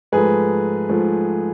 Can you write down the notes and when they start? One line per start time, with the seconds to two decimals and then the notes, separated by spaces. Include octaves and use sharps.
0.12 G#2 F3 A3 G#4 B4
0.89 G#2 F3 A3